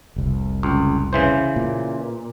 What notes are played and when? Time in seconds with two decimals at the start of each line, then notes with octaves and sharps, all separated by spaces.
0.16 F1 C2
0.63 C#2
1.13 C#3 E3 C5
1.56 A#2